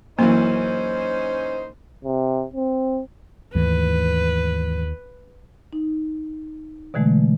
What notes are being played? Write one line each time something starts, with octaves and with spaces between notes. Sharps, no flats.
F#2 E3 A#3 C#4 D#4 C5
C3
C4
D#2 G#2 E3 A3 B4
D#4
B2 D3 E3 G#3 A3